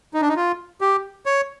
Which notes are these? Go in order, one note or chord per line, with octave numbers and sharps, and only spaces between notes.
D#4
D4
D#4
F4
G4
C#5